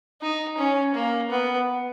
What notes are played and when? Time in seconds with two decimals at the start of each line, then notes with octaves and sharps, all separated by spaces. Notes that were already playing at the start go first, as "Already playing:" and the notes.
0.21 D#4
0.58 C#4
0.95 A#3
1.31 B3